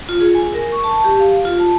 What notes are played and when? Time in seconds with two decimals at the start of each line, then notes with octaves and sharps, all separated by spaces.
0.09 F4
0.21 G#4
0.35 G#5
0.54 A#4
0.72 C#6
0.84 A5
1.05 G4
1.20 F5
1.45 F4
1.60 A5